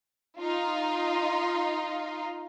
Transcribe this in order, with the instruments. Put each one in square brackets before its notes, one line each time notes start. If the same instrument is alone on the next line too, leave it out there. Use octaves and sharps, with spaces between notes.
[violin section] D#4 F4